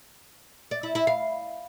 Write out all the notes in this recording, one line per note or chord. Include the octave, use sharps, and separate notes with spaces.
D5
E4
E4
F5